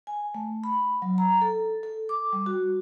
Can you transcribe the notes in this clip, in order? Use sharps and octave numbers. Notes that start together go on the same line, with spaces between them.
G#5
A3
B5
F#3
A#5
A4
A4
D6
G3
F#4